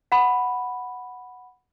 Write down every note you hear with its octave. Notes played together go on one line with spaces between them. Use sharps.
F#5 B5